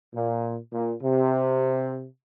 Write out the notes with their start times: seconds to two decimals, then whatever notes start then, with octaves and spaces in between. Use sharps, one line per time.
0.14 A#2
0.72 A#2
1.02 C3